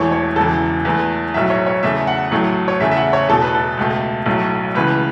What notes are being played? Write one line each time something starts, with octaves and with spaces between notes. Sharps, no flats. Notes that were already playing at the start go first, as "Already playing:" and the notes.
Already playing: E1 E2 E3 A3 C#5
C#5
E1 E2 C#3 E3 A4
E2 E3 A3 B4
B1 A2 F#3 E5
C#5
C#5
E2 C#3 A3 E5
F#5
A1 A2 F#3 A3
C#5
E2 C#3 A3 E5
E5
F#5
C#5
E2 B2 A3 A4
B4
A4
C#2 B2 A3
B1 A2 F#3 A3
C#2 C#3 E3 A3 B4